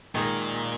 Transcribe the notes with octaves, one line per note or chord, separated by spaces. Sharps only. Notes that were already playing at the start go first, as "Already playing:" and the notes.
A#2 D#3 G#3 D#4 A#4